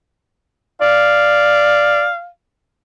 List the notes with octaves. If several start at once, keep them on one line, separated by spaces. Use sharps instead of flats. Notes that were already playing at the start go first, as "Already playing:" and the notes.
D5 F5